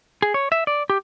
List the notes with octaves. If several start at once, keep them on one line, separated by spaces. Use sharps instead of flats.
G#4
C#5
E5
D5
G4